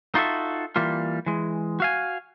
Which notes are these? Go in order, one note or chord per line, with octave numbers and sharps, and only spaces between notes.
D#4 F4 F#4 A4 E5
E3 G3 A#3 F4
E3 G#3
F#4 F5 G#5